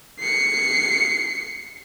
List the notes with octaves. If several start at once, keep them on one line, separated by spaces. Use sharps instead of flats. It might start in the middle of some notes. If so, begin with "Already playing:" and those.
C7 C#7